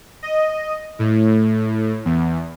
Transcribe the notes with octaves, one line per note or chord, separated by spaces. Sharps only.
D#5
A2
E2